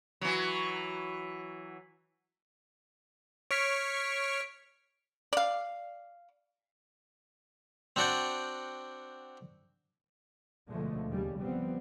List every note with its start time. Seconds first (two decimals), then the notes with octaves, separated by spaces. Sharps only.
0.21 E3 F#3
3.51 C#5 C#6 F6 B6 D7
5.33 D5 F5
7.96 C4 D4 F#4 D5 F#5 G5
10.70 D2 B2 D3 F3 G#3 A3
11.08 D#2 C#3 G3
11.40 F1 F3 G3 B3 C4